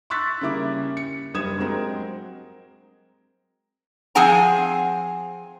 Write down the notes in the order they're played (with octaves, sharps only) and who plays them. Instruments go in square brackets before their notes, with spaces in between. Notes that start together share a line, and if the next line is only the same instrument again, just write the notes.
[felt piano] C6 C#6 E6 F#6 A6 B6
C#3 G3 A#3 E4 E5 D6
C#7
F#1 G2 G3 D#6 G#6 E7
F#3 G#3 C4 A#4
[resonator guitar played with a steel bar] F3 C4 G#4 F#5 G#5 A#5